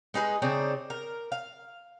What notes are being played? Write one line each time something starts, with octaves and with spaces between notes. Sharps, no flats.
G#3 D#4 G#4 B4
C#3 C4 D4 D#4
A#4
F5